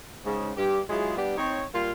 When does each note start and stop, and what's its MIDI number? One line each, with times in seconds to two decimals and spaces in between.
0.25 0.51 44
0.25 0.51 49
0.57 0.80 43
0.57 0.80 67
0.90 1.14 54
0.90 1.14 56
0.90 1.14 64
0.90 1.14 65
0.90 1.14 68
1.17 1.34 55
1.17 1.34 59
1.17 1.34 62
1.17 1.34 67
1.38 1.63 60
1.38 1.63 63
1.38 1.63 73
1.74 1.91 55
1.74 1.91 58
1.74 1.91 65